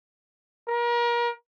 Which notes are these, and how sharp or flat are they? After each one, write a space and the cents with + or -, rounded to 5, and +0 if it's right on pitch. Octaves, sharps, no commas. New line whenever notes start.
A#4 +35